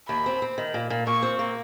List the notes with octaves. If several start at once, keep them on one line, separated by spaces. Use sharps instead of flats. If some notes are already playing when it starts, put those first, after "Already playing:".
D#2 B5
C4
C4
D#3
A#2
A#2
A#2 C#6
C4
A#3